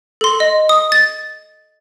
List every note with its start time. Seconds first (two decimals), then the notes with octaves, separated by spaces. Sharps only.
0.21 A4 C6
0.40 D#5
0.69 D#6
0.92 A6